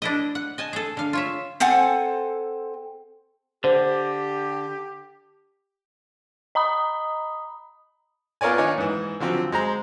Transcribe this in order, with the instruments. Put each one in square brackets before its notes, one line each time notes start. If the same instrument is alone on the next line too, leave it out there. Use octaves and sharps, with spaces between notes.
[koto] D4 E4 D#5
F#5
D#5 G#5 A5
G#4 A4
D3 F5
F4 C#5 E5
[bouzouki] C4 A4 F#5 G#5
[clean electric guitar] D3 [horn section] G4 [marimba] C5
[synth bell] D#5 A#5 B5 D#6
[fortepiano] B3 F4 A#4 C#5 D5 G#5
D#3 D4 D#4 C#5 G#5
G#2 E3
D3 F3 F#3 C4
G#3 C5 A#5